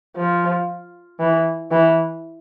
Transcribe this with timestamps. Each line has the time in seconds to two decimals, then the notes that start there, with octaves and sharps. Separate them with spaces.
0.16 F3
1.20 E3
1.71 E3